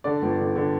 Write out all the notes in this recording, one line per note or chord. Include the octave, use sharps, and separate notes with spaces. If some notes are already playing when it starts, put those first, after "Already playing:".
D3 D5
G1
D3
D3